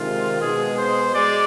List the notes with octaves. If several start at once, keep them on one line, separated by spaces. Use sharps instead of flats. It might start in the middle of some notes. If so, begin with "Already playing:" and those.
Already playing: C3 D#3 G#3 F4
B2 G#3 G#4
C5
G#3 D5